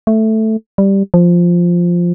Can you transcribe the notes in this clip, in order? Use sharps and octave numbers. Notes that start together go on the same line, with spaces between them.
A3
G3
F3